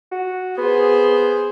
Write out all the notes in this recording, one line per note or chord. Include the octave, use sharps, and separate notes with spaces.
F#4
B3 G#4 C5